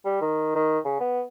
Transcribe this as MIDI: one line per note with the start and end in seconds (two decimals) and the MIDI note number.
0.05 0.20 55
0.21 0.52 51
0.55 0.79 51
0.85 0.98 49
1.00 1.22 59